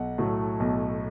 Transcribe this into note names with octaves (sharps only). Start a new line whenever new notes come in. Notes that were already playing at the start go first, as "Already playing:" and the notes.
Already playing: B1 F#5
A2 F#3 A3
B1